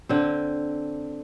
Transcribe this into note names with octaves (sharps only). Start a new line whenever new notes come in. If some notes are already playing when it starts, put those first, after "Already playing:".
D3 C4